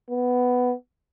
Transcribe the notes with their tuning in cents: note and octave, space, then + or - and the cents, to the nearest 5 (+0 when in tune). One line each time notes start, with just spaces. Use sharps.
B3 +5